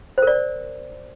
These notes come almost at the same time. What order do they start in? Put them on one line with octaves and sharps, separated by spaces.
C5 A#4 D5